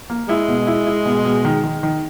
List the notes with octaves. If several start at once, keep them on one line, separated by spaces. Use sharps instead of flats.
A#3
G#3 E4
B2
E4
E4
B2
B2
D#3
D#3
D#3